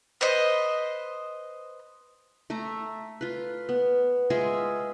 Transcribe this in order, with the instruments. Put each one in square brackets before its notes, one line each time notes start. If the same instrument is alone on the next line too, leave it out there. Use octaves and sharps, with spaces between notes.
[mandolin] B4 C5 D#5
[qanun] A3 E5 A#5
F4 B4
B3
G#3 F4 G#4 E5